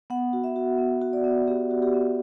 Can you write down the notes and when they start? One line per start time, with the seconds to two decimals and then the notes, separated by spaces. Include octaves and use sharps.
0.10 B3 F#5
0.33 F#4
0.44 E5
0.56 F#4
0.78 B3
1.01 F#4
1.13 D5
1.24 B3
1.47 B3 G4
1.71 F#4
1.82 G4
1.94 B3